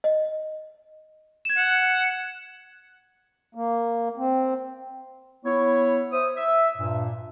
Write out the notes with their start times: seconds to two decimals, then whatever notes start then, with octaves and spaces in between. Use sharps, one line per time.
0.04 D#5
1.45 G#6 E7
1.57 F#5
3.55 A#3
4.17 C4
5.45 B3 E4 C#5
6.12 C5 E5 D#6
6.37 E5
6.78 G2 A#2